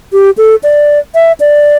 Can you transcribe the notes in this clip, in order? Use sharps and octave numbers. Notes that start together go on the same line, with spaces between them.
G4
A4
D5
E5
D5